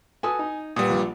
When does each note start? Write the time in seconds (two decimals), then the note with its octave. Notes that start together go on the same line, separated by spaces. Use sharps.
0.23 F#4 A4 B4 G#5 D#6
0.39 D#4
0.76 A#2 G3 B4 F#5 D#6
0.89 A#1 F4